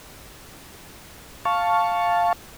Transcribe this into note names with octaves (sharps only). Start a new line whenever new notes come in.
F5 A5 C#6